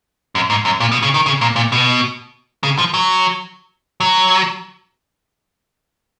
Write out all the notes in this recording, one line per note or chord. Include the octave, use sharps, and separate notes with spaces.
F#2
G#2
F#2
A#2
B2
C#3
D#3
C#3
A#2
A#2
B2
C#3
F3
F#3
F#3